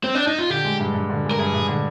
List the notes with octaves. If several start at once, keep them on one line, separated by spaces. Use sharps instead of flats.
C4
D4
D#4
F4
D3 G4
G#3
G2
G2
D3
G#3
A#4
G2 G#4
G2
D3